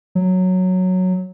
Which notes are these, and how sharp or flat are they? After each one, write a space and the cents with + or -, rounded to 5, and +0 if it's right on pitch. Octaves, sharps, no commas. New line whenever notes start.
F#3 -5